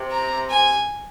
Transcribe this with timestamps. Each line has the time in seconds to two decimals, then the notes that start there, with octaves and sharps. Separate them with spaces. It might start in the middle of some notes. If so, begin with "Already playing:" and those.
Already playing: C3
0.11 A#5
0.50 G#5